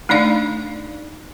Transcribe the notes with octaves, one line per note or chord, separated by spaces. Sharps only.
A3 D4 D#4 D5 F5